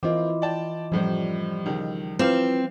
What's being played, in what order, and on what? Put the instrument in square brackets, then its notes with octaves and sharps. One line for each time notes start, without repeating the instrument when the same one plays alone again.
[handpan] E3 E4 F4 [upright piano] A#3 C4 [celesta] D#5 D6
[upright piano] D5 G5 A5
[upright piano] F#2 A2 C5 [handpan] F3 G3
[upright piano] C#2 D#3
[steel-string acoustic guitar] C4 [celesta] E4 F4 B4 [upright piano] F5 D6 E7